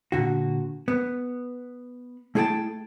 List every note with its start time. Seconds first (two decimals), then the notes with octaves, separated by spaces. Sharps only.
0.12 A#2 D3 F#4
0.88 B3
2.35 A3 E4 G#4 A4 G5 A5